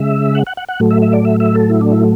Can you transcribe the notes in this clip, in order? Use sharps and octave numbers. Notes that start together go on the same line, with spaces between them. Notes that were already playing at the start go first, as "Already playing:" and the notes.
Already playing: C#3 G#3 E5
F#5
F#5
F#5
F#5
A2 F#3 A3
E5
E5
D5
E5
E5
A4
E4
D4
E4